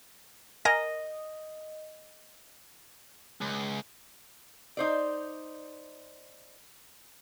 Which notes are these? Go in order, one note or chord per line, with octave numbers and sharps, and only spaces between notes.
A#4 D#5 G#5 A#6
C#2
D#4 C5 D5